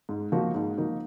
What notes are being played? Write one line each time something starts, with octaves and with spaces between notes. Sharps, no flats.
G#2
F3 A#3 D#4 F#4
G#2
F3 A#3 D#4 F#4